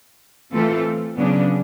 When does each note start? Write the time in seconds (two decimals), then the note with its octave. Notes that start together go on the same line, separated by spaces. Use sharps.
0.53 E3 A3 C4 F4 A4
1.17 C#3 F#3 B3 D4